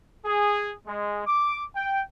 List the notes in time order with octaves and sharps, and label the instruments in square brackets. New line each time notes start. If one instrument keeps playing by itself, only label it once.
[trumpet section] G#4
G#3
D6
G5